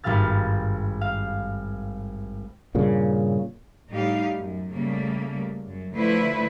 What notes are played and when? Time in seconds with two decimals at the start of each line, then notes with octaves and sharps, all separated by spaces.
0.04 G#1 G2 G3 F5 F6 A6
1.01 F5
2.75 G2 A#2 C#3
3.90 A2 G3 D#4 G4 F5
4.36 F#2
4.72 C#3 G3 A3 A#3
5.66 F#2
5.95 D3 F3 A3 E4 B4 C5